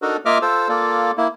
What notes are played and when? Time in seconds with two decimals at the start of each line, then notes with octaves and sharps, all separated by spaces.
0.02 D4 D#4 F#4 A4 A#4
0.26 A#3 F4 D#5 E5 D6 F6
0.42 F4 A4 C5 E6
0.69 A#3 F4 A4 D5
1.17 A#3 E4